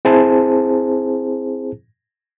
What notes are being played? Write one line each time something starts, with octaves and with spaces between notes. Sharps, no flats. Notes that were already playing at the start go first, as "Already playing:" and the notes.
C4 E4 G#4 C5 A5